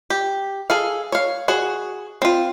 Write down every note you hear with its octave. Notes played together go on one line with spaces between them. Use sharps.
G4
G#4 A4 F5
C#5 F5
F#4 G#4
C4 F4